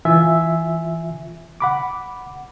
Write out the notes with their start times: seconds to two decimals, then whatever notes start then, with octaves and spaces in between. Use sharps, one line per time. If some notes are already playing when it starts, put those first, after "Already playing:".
0.05 E3 F4 E5 G#5 E6
1.60 F#5 B5 D6